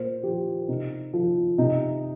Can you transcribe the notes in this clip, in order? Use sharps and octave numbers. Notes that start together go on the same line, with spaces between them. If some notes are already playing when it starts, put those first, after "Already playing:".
Already playing: A#2 C5
F3 G4
C3 D#4
F3
C3 D#4